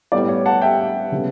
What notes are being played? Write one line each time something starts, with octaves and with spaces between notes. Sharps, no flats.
A2 G3 B3 D5
C#5
F#5 A5
E5 G5
C#3 G3 B3